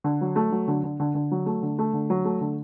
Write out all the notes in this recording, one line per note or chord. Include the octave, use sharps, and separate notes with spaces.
D3
F#3
A3
F#3
D3
D3
D3
D3
F#3
A3
D3
A3
D3
F#3
A3
D3